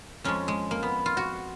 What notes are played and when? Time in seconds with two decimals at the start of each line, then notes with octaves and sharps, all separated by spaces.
0.24 F2 F3 G#3 C#4
0.48 G#3
0.71 A#3
0.83 B3
1.06 F4
1.17 F#4